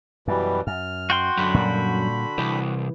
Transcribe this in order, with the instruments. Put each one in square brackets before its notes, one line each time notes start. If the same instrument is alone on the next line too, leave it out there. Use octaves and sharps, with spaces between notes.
[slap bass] F#2 [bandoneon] B2 E3 G3
[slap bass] F#2 [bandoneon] F6
[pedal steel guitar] F#4 G5 C6
[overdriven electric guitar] F#2 [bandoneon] D3 B5
[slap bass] A#2 G3
[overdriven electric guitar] C2 [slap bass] E3